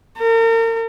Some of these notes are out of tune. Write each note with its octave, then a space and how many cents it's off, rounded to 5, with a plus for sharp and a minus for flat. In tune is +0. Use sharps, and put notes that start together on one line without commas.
A#4 -40